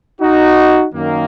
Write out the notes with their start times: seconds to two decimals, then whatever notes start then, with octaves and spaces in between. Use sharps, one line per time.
0.20 D#4 F#4
0.94 F#2 D#3 A#3